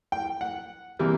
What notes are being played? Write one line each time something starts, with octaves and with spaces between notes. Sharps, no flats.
G5
F#5
C3 E3 G3 A#3